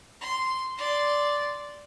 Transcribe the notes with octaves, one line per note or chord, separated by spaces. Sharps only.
C6
D5 C6